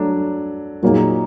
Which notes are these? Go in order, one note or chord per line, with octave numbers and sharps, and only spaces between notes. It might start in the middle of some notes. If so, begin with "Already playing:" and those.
Already playing: F#3 A3 D4
A#2 F#3 A#3 D#4 G#4